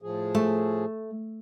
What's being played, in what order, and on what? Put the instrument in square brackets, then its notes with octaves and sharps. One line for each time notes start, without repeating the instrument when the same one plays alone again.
[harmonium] A2 F3 G#4
[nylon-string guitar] A3